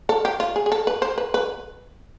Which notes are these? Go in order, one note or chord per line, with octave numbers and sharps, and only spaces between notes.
A4
G4
F4
G#4
G#4
A4
B4
C5
B4
B4